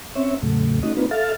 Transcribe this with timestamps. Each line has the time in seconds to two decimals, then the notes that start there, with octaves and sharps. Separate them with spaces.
0.15 C4 C#4 C#5 E5
0.42 E2 A2 C#3 F#3 A3
0.83 A3 C#4 D#4 F#4 D#5
0.97 A#3 C4 D4 D#4 F4 B4
1.11 A4 E5 F5 F6 A6